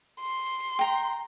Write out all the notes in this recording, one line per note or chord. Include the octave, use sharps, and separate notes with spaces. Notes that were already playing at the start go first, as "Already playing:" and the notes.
C6
G5 A#5